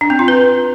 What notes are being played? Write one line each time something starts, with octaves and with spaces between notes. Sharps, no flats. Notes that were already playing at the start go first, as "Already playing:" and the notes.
D4
C4
F4
B4